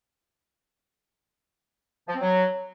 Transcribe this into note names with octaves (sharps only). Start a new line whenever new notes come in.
F3
C4
F#3